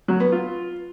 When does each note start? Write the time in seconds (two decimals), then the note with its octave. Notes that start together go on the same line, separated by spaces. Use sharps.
0.08 F#3
0.20 B3
0.32 F4